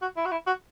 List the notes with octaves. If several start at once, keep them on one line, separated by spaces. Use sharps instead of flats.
F#4
E4
F#4
E4
F#4